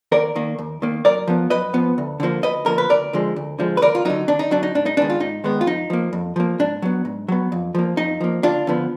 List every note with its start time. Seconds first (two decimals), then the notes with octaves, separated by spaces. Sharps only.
0.12 D#2 A#4 D5
0.35 D#3 A#3
0.59 D#2
0.82 D#3 A#3
1.05 F#2 A#4 D5
1.28 F3 B3
1.50 F#2 B4 D#5
1.73 F3 B3
1.98 D2
2.20 D3 F3 A#3
2.43 D2 B4 D#5
2.66 D3 F3 A#3 A#4
2.78 B4
2.89 D2 A#4 D5
3.13 D3 F3 G#3
3.36 D2
3.59 D3 F3 G#3
3.77 B4
3.82 D#2 A#4 D5
3.95 F4
4.05 D3 F#3 D#4
4.28 D#2 D4
4.39 D#4
4.51 D3 F#3 D4
4.63 D#4
4.75 G#2 D4
4.86 D#4
4.97 D#3 G#3 B3 D4
5.10 F4
5.20 G#2 D#4
5.44 D#3 G#3 B3
5.61 F4
5.66 F2 D#4
5.90 F3 A#3
6.13 F2
6.36 F3 A#3
6.59 G#2 D4
6.82 F#3 B3
7.05 G#2
7.28 F#3 B3
7.52 F2
7.75 F3 A#3
7.97 F2 D#4
8.20 F3 A#3
8.43 D2 D4 F4
8.67 D3 F3 B3